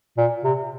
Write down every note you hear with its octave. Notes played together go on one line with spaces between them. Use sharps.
A#2
C3